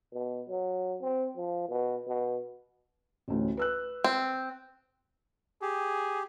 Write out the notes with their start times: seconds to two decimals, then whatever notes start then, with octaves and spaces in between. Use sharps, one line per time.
0.13 B2
0.49 F#3
1.02 C4
1.37 F3
1.69 B2
2.07 B2
3.28 A1 D2 A2
3.57 B4 E6 F#6
4.04 C4
5.62 G4 G#4